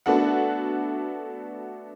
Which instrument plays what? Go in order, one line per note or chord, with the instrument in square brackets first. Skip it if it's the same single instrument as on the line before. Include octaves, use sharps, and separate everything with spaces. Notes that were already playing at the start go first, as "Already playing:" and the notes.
[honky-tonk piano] A3 B3 D4 F#4 A4 F#5